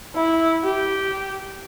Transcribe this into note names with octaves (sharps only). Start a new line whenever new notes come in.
E4
G4